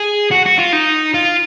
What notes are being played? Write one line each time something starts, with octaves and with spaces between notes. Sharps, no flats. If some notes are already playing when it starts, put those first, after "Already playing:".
Already playing: G#4
F#4
F#4
F4
D#4
F4